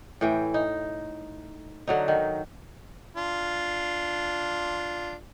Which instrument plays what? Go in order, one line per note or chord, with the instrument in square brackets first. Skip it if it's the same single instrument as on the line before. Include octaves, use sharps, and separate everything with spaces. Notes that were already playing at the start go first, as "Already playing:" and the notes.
[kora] A2 E3 G5
D#4
D3 F#3 D#4
D#3
[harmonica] D4 F4